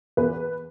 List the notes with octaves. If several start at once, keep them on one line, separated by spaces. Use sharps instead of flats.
E2 B4